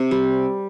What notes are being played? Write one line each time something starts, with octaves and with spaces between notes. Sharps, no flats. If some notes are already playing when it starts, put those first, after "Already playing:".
Already playing: C3 C4
G3